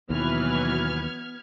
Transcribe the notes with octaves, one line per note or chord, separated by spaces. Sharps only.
D#2 B2 E3 F#3 B3 B4 F6 G#6